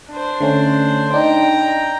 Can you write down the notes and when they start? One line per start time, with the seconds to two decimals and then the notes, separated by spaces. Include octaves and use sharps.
0.10 D4 C5
0.41 D3 A3 C#4
1.14 D4 D#4 G5 A#5